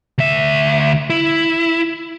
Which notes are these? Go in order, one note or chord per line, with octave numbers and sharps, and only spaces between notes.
D2 E5
E4